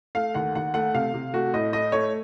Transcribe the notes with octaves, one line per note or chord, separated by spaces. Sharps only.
A3 F5
D#2 F#5
D#2 F#5
A3 F#5
C3 F5
C3
A3 F#4
A2 D#5
A3 D#5
A3 C#5